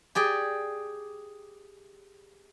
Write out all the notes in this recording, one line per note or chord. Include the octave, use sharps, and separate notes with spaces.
G4 G#4 D5